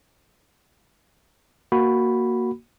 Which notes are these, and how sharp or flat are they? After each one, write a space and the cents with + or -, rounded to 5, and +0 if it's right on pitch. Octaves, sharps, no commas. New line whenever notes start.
A#3 +0 F#4 +0 B5 +0